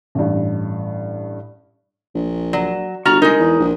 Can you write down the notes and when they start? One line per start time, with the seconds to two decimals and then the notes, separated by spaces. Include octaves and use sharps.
0.15 A1 G2
2.15 A#1
2.53 F#3 D5
3.05 G1 F#4 A#5 F6 A6 F7
3.22 G#3 D#4 A#4
3.39 E2
3.60 A#1